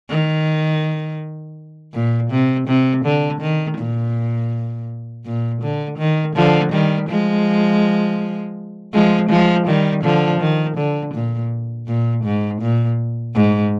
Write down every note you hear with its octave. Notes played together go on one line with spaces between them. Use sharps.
D#3
A#2
C3
C3
D3
D#3
A#2
A#2
D3
D#3
D3 F3
D#3 G3
F3 G#3
F3 G#3
F3 G#3
D#3 G3
D3 F3
D#3
D3
A#2
A#2
G#2
A#2
G#2